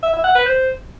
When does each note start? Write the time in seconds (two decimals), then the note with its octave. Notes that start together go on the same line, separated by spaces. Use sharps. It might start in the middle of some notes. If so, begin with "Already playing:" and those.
0.03 E5
0.13 E5
0.24 F#5
0.35 B4
0.46 C5